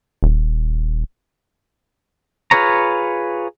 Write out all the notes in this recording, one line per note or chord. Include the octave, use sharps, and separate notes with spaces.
D#1
F4 G#4 B4 C#5 A#5